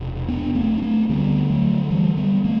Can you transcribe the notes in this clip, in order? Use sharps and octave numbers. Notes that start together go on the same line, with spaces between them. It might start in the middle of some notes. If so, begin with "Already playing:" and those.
Already playing: E1 C3
B3 D4
A3 C4
D4
A3 C4
D2 D3 G3 B3
F#3 A3
E3 G3
G3 B3
A3 C4